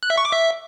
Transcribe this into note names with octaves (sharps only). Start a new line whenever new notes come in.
F#6
E5
C#6
D6
E5